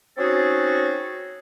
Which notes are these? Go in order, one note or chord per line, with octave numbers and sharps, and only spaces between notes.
C4 C#4 D#4 F#4 G#4 A4